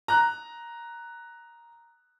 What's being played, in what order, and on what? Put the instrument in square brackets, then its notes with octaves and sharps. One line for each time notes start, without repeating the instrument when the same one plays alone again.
[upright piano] A#5 F#6